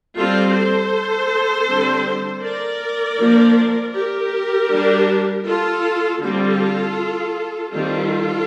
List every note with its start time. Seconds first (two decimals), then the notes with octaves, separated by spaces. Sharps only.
0.16 G3 C4 F4 A4
0.54 A4 C5
1.68 D3 G3 C4
2.44 A#4 D5
3.19 F3 A#3 D4
3.95 G4 A#4
4.70 G3 D4
5.46 F4 A4
6.22 D3 G3 C4 F4 A4
7.73 D#3 G3 C4 F4 A4